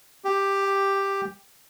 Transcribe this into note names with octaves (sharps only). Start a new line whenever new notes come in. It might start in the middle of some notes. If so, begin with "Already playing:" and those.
G4